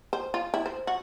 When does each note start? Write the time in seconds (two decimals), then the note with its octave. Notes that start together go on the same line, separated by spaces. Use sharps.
0.13 C5
0.34 F4
0.54 E4
0.66 C5
0.87 F#4